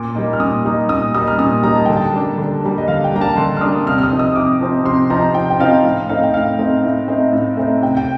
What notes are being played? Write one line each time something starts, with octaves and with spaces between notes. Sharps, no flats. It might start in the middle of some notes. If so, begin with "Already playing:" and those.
Already playing: A#2 D6
G3 A#3 D#4
F6
A#2 D#6
G3 A#3 D#4
A#2 D#6
G3 A#3 D#4 D#6
F6
A#2 D#6
G3 A#3 D#4 A#5
A5
D3 G5
A5
G3 A#3 D4
D3
G3 A#3 D4
D#5
D3 F5
G5
G3 A#3 D4 A#5
A5
D3 C6
F6
G3 A#3 D4 D#6
C3 F6
F6
D#6
F3 C4 D#4
D#6
C3 D6
F3 C4 D#4
C3 C6
F3 C4 D#4 A#5
C3 G5
G5
F3 C4 D#4 F5
A2 F5
A3 C4 D#4 F5
G5
A2 F5
A3 C4 D#4
A2
A3 C4 D#4
A2
A3 C4 D#4
C3 G5
G5